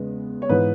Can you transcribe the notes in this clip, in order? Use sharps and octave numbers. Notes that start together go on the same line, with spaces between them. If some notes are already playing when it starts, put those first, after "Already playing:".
Already playing: E2 C#3 G#3 B3
C#5
G#2 E3 B3 B4